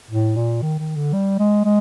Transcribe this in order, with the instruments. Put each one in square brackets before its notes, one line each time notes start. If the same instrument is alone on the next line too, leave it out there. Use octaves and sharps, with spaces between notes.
[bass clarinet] A2
A#2
D#3
D#3
D3
G3
G#3
G#3